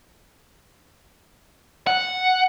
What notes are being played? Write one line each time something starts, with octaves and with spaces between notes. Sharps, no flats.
F#5